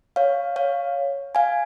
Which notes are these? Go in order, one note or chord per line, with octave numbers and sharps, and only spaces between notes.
C#5 F5
C#5 F5
F5 G#5